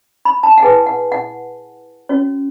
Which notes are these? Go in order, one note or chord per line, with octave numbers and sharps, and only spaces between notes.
B5
A5
F#5
E4 G#4 B4 G#5
F#5
F#5
C#4 F#4 C#5